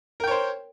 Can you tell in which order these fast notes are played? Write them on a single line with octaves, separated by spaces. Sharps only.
A#4 G5 C#5 C5